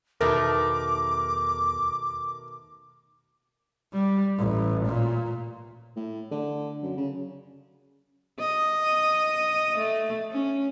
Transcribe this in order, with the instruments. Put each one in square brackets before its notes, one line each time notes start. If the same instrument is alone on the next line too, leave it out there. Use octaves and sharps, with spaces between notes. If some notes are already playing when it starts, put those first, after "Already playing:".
[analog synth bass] E2 [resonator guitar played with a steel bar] B2 D#3 A3 [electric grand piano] A#4 [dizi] D6
[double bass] G3
A1
A#2
[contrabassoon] A2
D3
F#2
C#3
[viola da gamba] D#5
A3
C#4